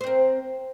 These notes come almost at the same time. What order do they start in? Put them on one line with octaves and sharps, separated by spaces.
C5 C4 A#4